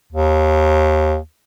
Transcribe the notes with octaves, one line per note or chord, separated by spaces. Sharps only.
D#2